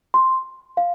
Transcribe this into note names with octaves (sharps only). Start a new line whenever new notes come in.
C6
F5